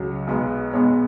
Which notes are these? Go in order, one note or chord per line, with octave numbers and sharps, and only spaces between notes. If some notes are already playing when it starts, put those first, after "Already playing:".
Already playing: C#2 F#3 C#4
B1 B2 G#3 B3
B1 B2 G#3 B3 C#5